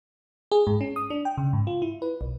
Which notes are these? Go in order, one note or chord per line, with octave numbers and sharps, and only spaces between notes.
G#4
G#2
C#4
D#6
D4
G5
C#3
G#2
F4
E4
B4
B1